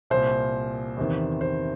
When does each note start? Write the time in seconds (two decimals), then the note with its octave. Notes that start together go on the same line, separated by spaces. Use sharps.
0.10 C2 A#2 C5
0.97 E2 C3 D#3
1.41 C5